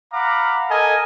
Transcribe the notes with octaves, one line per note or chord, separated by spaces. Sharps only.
F5 F#5 A#5 B5 D6
A4 A#4 D#5 G#5